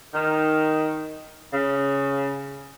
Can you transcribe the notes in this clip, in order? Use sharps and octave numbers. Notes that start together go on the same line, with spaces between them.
D#3
C#3